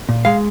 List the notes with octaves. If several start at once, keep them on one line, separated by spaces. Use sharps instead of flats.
A#2
G#3 F5